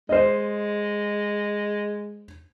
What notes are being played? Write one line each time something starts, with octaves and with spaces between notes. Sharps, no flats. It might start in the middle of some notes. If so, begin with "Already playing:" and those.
G#3 C5 D#5